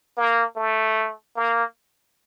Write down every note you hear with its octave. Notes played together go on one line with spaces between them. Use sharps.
A#3
A3
A#3